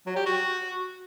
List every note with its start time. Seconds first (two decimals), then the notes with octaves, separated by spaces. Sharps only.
0.07 F#3
0.16 G4
0.26 F#4